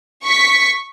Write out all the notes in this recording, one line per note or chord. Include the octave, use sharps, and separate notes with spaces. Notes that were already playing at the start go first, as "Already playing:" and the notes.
C#6 B6